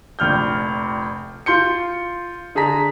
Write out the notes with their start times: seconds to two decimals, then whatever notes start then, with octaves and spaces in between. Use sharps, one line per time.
0.19 F1 A#1 F6 G6
1.46 F4 C6 G6 C#7
2.55 D3 G#4 A5 A#5 B6